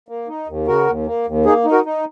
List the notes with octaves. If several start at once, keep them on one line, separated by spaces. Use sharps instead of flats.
A#3
D#4
D#2
C#3 F#4 A#4
D#2
A#3
D#2
A#3 D#4 G#4
D#4
F#4 A#4
D#4